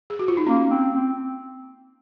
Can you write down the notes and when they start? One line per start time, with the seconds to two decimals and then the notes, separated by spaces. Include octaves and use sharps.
0.10 G#4
0.19 F#4
0.28 F4
0.37 D#4
0.47 A#3 C#4
0.70 C4
0.95 C4